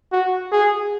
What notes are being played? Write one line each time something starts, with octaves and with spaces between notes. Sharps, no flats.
F#4
G#4